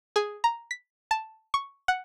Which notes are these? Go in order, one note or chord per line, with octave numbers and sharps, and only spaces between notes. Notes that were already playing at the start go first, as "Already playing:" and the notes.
G#4
A#5
B6
A5
C#6
F#5